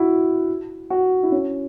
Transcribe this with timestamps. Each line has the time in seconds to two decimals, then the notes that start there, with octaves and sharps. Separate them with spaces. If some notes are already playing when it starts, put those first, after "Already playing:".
Already playing: E4 F#4
0.90 F#4
1.23 E4
1.32 C#4